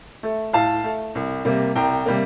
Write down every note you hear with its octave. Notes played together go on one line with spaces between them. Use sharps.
A3
A2 F5 A5
A3
C2
C3 G3 A#3
C2 G5 A#5
C3 G3 A#3